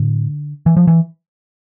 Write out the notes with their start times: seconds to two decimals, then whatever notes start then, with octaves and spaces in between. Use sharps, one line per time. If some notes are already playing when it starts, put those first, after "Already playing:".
Already playing: A2 D3
0.66 E3
0.77 F3
0.87 E3